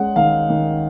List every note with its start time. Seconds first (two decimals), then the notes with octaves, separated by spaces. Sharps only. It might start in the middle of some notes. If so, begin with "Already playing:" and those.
Already playing: G#3 C#4 F#5
0.16 D#3 F5
0.50 D#3